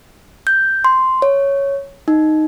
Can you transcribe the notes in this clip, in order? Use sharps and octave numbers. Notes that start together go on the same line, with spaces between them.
G6
C6
C#5
D#4